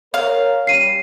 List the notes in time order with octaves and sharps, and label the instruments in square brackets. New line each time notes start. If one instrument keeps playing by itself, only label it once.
[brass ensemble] A#4 C#5 [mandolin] F5
[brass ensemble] G3 C#4 [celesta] C7 D#7